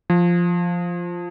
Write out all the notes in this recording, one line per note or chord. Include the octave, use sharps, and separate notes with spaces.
F3